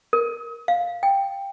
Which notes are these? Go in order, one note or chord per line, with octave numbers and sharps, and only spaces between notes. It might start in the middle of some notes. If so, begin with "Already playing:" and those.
A#4
F5
G5